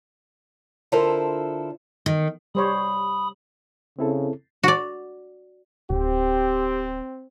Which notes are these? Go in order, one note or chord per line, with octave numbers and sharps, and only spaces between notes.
D3 E4 F4 A4 A#4 C5
D#3
G3 C5 C#5 B5 D#6
C#3 C4 E4 A4
F#4 D5
D1 C4 G4